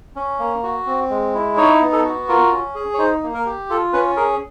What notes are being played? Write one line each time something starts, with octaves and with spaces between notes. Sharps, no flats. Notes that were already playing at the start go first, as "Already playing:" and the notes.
C#4
A#3
F#4
C4
G#3
E4
D#4 C#5
B3
A4
F#4
F4 A#4
C#4
G#4
C#5
D#4 C5
A#3
A#4
G4
F4 A4
C#4 B4
G#4 A#4